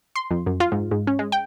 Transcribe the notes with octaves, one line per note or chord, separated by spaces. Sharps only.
C6
F2
F#2
F4
G#2
G#2
C#4
G#3
G5